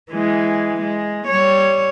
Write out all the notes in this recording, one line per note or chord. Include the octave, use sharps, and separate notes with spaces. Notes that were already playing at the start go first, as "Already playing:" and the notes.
E3 G#3
G#3
G3 C#5